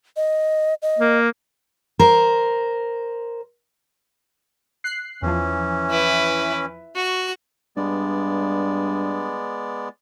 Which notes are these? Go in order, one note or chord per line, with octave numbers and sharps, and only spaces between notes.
D#5
D#5
A#3
A#4 C5
F#6 C7
E2 E3 F3 C#4
E4 B4
F#4 C#6
G2 G#3 B3 D5